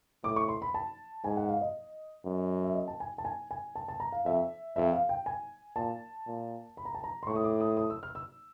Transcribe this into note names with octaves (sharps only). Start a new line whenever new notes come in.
A2 D6
C#6
C6
B5
A5
G#2 G#5
F#5
F5
D#5
F#2
E5
D#5
A5
G#5
A5
G#5
G#5
A5
A5
A#5
F5
F2 E5
F2 E5
F5
G5
G#5
A#2 A5
A#2
B5
A#5
A5
A#5
C6
A2 C#6
D#6
D6
D#6
D#6
E6
F6
E6